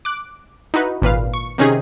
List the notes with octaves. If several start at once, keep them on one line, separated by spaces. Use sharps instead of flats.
D6 F#6
D#4 E4 F#4 B4
G#1 A#2 B4 F5
C#6
C3 D#3 C#4 D#4 G#4